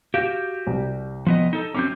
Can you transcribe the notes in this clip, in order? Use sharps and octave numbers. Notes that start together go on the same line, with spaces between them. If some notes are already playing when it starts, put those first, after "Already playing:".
F#4 G4 F5 G6
C2
F3 B3 D#5
D#4 A4
F#3 C4 C#4 D6 G6